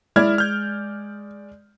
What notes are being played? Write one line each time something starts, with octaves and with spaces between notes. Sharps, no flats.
G#3 E4 D5 F6 G#6
F6 G6